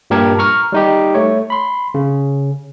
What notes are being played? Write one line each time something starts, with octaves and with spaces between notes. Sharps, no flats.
G2 A#2 G4 A#4 A5 G#6
A#5 C#6 F6
G3 D#4 G4
A3 C#5
B5 C6
C#3